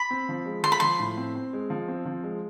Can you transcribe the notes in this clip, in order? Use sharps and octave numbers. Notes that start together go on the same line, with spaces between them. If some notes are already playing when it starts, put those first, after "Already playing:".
Already playing: B5
C4
F3
G#3
F3 C6
B5
F3 C6
A2
C4
C4
G#3
F3
C4
F3
G#3